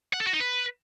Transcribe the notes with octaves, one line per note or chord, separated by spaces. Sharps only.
F#5
A4
F#4
D#4
B4